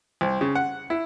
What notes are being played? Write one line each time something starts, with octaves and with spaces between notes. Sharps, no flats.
C2
C#3
F#5
E4